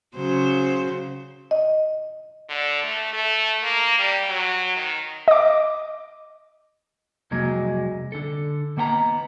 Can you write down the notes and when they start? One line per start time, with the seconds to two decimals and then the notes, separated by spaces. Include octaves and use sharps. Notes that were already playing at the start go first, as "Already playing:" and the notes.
0.16 C#3 F#3 C5
1.51 D#5
2.49 D3
2.84 A3
3.13 A3
3.63 A#3
3.98 G3
4.29 F#3
4.76 D#3
5.28 D#5 D6
7.31 C2 F2 F#3 G#3 A#3
8.12 D3 A4
8.77 D#3 A#3 B3 G5 A#5